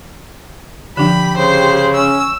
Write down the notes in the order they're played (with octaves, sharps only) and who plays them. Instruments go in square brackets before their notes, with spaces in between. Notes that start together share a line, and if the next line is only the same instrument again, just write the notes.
[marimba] D3 F3 D4 [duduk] G4 [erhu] B5
[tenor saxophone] C#3 [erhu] C5
[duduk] C#4 [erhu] E6